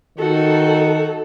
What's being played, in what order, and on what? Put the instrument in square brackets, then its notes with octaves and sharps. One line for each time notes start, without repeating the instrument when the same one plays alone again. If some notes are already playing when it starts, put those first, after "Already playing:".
[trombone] D#3 [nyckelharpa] D#4 F#4 [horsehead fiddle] A4